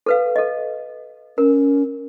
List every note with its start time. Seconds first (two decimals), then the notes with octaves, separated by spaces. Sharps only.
0.06 A4 B4 F5
0.36 A4 D#5
1.38 C#4 A#4